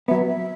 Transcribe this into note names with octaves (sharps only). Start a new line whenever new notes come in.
F#3 B3 E5
E5